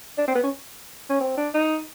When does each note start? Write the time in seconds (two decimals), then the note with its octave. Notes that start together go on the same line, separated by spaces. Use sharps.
0.18 D4
0.27 C4
0.35 B3
0.43 C#4
1.10 C#4
1.20 C4
1.37 D4
1.54 D#4